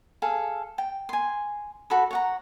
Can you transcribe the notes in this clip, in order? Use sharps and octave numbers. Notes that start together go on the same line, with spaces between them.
G#4 A4 F5
G5
G#5 C6
F#4 A4 B5
C#5 F#5 A#5